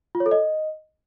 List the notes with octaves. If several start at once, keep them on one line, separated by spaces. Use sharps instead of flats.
F4
C#5
A4
D#5